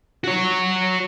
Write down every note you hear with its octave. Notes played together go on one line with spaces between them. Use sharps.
F#4 C#5